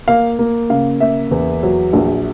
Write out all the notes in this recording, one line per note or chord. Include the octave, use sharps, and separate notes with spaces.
A#3 F5
A#3
C#3 F5
A#3 E5
E2
F#3
A#1